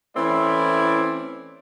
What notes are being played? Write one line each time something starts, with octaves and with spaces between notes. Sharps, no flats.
E3 A3 C4 C#4 E4 D5